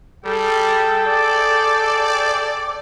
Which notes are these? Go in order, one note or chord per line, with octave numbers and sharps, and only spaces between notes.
G3 G#4 A4 G5
D5